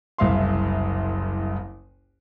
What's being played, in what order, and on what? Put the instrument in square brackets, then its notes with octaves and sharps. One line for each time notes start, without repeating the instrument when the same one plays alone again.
[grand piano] F#1 C2 E5 F5 C6